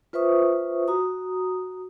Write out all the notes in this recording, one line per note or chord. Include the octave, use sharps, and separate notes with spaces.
F4 B4 C5 E5 C#6 D#6
F#4 A#5 D#6